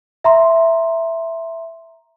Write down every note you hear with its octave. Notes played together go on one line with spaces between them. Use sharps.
E5 A#5 C6